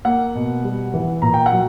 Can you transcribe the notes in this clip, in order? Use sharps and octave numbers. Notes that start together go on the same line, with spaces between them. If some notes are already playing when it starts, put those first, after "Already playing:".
A#3 F#5
B2
G3
E3
A#2 A#5
G5
F#5
F#3